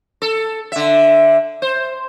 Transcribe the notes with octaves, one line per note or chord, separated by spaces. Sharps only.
A4
D3 E5
C5